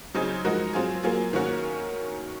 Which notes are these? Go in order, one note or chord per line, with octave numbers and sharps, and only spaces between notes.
C#3 F#3 C4 D#4 G#4
F3 G#3 D#4 F#4 A#4
F#3 C4 F4 G#4
F#3 A#3 F4 G#4
D#3 A#3 C#4 F#4